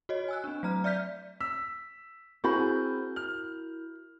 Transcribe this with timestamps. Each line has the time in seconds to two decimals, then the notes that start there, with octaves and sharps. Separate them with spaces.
0.09 F#4 C#5 D#5
0.28 G#5 E6 F#6
0.44 C4 D4
0.63 F#3 A3 A#5 F6
0.84 D5 E5 F6 G6 B6
1.41 E6 B6
2.44 C4 E4 F#4 G#4 A#4 B5 G6
3.16 F6